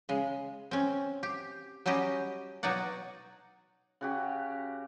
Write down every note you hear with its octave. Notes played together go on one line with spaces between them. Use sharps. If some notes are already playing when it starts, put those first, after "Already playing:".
C#3 G#3
C4 C#4
G4
F#3 G3 C#4 G4 D#5
B2 F#3 D#4 C#5 D5 F#5
C#3 F#4 G4